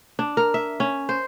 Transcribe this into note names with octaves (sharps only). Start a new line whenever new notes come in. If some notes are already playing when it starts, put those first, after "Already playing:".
D4
A#4
E5
C#4
C5